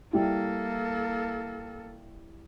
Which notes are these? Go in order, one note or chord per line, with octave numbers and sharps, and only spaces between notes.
G3 A#3 E4 A4